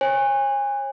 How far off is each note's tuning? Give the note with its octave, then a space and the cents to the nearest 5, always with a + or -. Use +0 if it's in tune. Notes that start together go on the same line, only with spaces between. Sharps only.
C#5 -30 G#5 -30